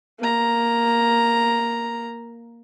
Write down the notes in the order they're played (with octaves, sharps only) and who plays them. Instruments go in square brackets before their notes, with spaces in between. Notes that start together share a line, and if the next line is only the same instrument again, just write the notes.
[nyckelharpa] A#3 A#5